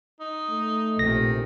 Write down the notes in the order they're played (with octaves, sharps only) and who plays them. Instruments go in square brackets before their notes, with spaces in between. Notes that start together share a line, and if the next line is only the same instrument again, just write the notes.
[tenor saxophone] D#4
[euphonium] A3
[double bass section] A#1 C3 [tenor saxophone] D#3 [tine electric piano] A#6